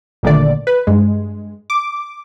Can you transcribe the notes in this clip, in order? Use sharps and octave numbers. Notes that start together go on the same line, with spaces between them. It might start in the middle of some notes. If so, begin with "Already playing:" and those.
G#1 A#2 D3 D#3 A3 D5
B4
G2 G#3
D6